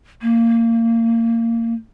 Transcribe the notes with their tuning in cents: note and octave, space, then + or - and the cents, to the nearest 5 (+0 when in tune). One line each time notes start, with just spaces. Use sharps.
A#3 -20